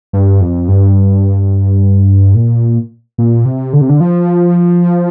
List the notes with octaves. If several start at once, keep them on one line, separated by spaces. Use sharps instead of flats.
G2
F2
G2
A#2
A#2
C3
D3
C3
D3
F3